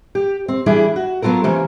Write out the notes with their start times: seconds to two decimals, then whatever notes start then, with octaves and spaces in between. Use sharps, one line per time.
0.15 G4
0.48 C4
0.66 E3 G3 D4 E4 G#4
0.96 F#4
1.22 F#3 B3 F4 A4 A#4
1.44 C3 E3 A#3 C#4